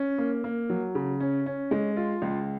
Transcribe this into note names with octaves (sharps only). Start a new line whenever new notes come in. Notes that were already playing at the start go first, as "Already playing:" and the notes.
Already playing: C#4
A#3
A#3
F#3
C#3
C#4
C#4
G#3
F4
C#2